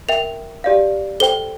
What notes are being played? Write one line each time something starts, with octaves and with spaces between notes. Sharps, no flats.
A#4 E5 G5 F7
G4 D5 F5
A4 C5 G5 G7